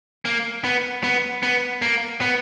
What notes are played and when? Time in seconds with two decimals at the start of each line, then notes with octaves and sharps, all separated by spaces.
0.25 A#3
0.64 B3
1.04 B3
1.43 B3
1.82 A#3
2.21 B3